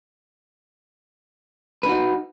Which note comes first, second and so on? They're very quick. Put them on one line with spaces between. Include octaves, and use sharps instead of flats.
B4 D4 F#4 D#4